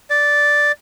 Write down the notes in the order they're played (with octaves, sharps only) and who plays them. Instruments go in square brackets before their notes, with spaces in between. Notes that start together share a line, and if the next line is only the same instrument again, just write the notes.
[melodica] D5